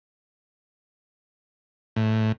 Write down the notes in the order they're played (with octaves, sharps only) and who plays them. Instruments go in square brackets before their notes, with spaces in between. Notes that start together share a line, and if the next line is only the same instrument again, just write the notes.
[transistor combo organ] A2